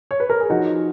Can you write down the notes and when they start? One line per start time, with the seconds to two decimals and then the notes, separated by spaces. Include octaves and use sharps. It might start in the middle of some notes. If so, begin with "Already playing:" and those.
0.11 C#5
0.20 B4
0.30 A#4
0.40 G#4
0.50 F3 D#4 F#4